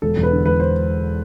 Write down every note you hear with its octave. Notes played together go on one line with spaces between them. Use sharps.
E1 A4
E2
B4
D3
E1 B4
C5